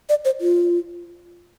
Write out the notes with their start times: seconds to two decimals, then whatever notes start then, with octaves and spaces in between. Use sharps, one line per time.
0.09 D5
0.25 C5
0.41 F4